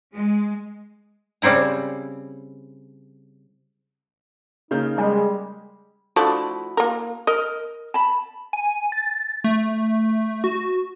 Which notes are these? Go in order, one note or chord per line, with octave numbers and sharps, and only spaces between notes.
G#3
C#3 G3 C4 E4 A#5
C#3 A#3 D#4 G6
G3 G#3
F3 A3 D4 E4 F#4
A#3 A#4
A#4 D#5
A5 B5
G#5
A6
A3
F#4